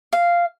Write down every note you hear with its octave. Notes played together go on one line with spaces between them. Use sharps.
F5